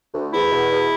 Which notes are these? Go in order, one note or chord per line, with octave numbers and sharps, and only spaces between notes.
D2
E2 E4
B2
E2